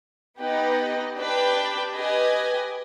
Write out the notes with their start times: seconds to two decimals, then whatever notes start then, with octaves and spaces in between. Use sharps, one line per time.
0.40 B3 D#4 G4 B4 D#5
1.17 D4 G4 B4 D5 G5
1.94 G4 B4 D#5 G#5